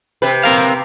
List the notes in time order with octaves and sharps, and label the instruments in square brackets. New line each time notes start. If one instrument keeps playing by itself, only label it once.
[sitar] C3 B4
[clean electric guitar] C4 A#4 F5